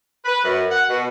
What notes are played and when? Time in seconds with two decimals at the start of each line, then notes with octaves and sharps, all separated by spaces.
0.24 B4
0.45 F#2
0.71 F#5
0.89 B2